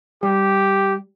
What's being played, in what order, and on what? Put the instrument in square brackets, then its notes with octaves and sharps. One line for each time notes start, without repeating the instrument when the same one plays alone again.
[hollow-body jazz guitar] G3 [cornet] G4